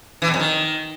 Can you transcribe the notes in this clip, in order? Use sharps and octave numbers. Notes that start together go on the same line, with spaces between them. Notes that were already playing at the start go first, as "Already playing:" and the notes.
E3
B2
F2
D#3